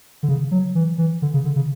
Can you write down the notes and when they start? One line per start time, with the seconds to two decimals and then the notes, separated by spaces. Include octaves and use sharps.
0.23 D3
0.29 C#3
0.51 F#3
0.75 E3
0.98 E3
1.22 D3
1.34 C#3
1.45 D3
1.56 C#3